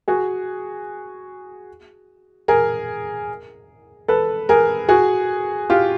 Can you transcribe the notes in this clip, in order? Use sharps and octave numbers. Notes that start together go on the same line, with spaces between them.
F#4 G#4
G#4 A#4
A4 B4
G#4 A#4
F#4 G#4
F4 G4